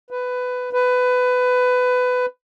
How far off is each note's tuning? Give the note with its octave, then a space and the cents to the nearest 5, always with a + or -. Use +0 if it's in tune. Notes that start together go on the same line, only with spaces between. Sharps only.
B4 +15
B4 +20